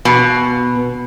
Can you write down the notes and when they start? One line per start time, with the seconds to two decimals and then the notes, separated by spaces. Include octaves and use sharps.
0.05 B2